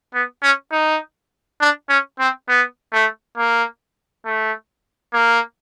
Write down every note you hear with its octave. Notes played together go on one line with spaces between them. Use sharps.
B3
C#4
D#4
D4
C#4
C4
B3
A3
A#3
A3
A#3